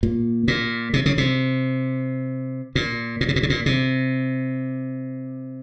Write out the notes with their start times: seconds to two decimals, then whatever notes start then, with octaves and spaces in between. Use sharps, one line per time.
0.03 A#2
0.48 A#2
0.94 C3
1.06 C#3
1.18 C3
2.75 A#2
3.21 A#2
3.29 C3
3.36 A#2
3.43 C3
3.50 A#2
3.66 C3